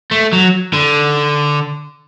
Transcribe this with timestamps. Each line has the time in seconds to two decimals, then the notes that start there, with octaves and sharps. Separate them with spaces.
0.11 A3
0.33 F#3
0.73 D3